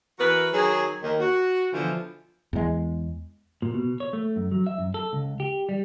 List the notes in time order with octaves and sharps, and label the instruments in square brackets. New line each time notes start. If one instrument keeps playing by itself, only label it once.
[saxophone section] E3 F#4 A#4 B4
D#3 F#3 G#4
D#2 D#3
F#4
B2 D3 E3 F3
[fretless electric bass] E2 G#3
[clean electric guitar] A#2
B2
C#5
A3
F#2
F#3
E5
F#2
A4
C#2
G4
G3